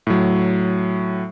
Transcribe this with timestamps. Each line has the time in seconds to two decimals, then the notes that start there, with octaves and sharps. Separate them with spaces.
0.07 A2 F#3